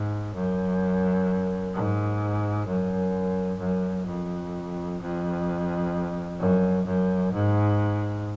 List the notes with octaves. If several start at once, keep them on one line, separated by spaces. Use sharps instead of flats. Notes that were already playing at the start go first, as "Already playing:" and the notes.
Already playing: G#2
F#2
G#2
F#2
F#2
F2
F2
F#2
F#2
G#2